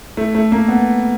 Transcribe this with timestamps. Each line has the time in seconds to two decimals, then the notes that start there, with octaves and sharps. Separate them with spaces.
0.17 A3
0.35 A3
0.52 A#3
0.68 B3